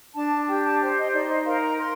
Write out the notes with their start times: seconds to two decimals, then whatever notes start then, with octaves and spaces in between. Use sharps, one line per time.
0.15 D4 A5
0.47 G4 G5
0.64 A5
0.80 C5 G5
0.97 D#5
1.13 D#4 D5
1.29 D#5
1.45 A#4 F5
1.62 A#5
1.78 A#4 C6